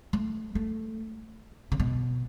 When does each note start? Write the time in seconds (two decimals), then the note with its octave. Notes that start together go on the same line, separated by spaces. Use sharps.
0.13 A3
0.55 A3
1.72 C#3
1.80 B2